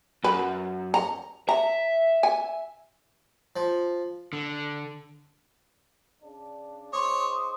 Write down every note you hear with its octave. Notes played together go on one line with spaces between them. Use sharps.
F#2 B4
A#5
E5 A#5
G#5
F3
D3
C#3 D4
G#2 C5 C#5 C6 D6 D#6